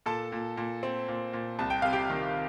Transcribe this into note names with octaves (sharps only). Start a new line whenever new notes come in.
A#2 A4 A5
A#2
A#2
C4
A#2
A#2
C2 A5
G5
C3 F5
G4 G5
D#3